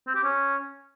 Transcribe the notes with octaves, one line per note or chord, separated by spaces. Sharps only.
C4
G4
C#4